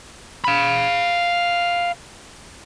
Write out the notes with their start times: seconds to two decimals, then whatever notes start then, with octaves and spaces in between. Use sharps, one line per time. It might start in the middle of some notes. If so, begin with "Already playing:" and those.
0.44 F5 B5